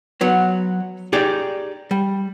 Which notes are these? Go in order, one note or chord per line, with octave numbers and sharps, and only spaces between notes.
F#3 B3
D#4 G4 G#4 D5
G3